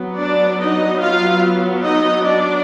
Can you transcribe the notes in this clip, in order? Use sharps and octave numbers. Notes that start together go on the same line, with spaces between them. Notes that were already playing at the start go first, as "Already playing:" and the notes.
Already playing: F#3 B3
D4 D5
D#4 D#5
F4 F5
D#4 D#5
D4 D5